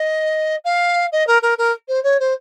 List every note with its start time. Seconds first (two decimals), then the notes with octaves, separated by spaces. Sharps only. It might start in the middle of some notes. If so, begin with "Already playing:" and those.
Already playing: D#5
0.65 F5
1.12 D#5
1.27 A#4
1.42 A#4
1.58 A#4
1.88 C5
2.03 C#5
2.20 C5